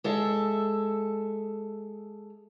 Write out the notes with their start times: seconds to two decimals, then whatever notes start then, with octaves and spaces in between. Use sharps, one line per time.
0.04 G#3 A4 E5